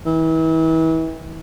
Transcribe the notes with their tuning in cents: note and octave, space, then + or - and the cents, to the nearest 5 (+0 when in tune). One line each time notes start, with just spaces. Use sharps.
E3 -35